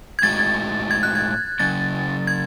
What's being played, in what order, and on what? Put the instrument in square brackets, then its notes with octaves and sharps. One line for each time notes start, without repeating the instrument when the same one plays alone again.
[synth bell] G#6
[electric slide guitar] A2 G#3 D#4 F#4 [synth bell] A6
[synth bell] G#6
F#6
G#6
[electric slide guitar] C#3 F#3 C#4 [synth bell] A6
[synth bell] G#6